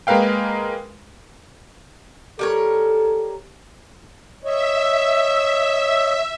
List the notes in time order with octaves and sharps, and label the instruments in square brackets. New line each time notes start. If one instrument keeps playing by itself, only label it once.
[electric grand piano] G#3 A#3 A#4 B4 F5 G5
[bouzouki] G3 A#4 C#5 [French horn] A4
[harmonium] C#5 D#5 [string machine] E5